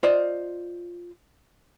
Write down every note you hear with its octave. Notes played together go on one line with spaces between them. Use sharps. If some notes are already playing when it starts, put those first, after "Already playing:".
F4 C5 D5 D#5